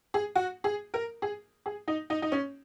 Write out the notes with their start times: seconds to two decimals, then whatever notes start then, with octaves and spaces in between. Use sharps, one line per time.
0.14 G#4
0.35 F#4
0.64 G#4
0.94 A#4
1.22 G#4
1.66 G#4
1.88 D#4
2.10 D#4
2.22 D#4
2.32 C#4